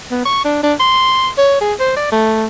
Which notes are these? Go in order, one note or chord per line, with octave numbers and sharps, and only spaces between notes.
B3
C#6
D4
D4
C6
C#5
G#4
C5
D5
A3